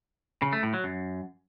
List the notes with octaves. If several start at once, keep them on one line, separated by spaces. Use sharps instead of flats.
C#3
A3
A2
F#3
F#2